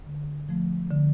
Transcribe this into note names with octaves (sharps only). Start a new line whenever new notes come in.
D3
F3 A3
D3